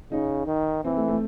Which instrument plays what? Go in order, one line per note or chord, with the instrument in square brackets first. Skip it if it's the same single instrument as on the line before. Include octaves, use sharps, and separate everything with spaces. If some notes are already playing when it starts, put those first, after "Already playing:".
[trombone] C#3 [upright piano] D#4
[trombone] D#3
[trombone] E3 [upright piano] C4
[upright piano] A3
A3